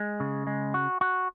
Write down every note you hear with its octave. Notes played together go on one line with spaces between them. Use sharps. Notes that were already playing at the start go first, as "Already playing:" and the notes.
Already playing: G#3
C#3
G#3
F#4
F#4